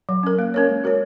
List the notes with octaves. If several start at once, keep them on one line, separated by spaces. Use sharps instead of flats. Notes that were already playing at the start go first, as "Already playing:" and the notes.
F#3
C#4 A#4
A#3
C#4 A#4 C#5
G#3
F#4 A#4 C#5